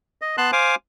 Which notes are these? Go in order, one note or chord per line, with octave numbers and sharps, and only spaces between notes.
D#5
B3 A5 C6 F#6
C5 F5 G#5 D6